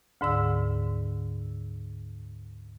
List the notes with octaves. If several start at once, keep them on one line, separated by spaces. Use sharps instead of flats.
D2 G#2 D3 E6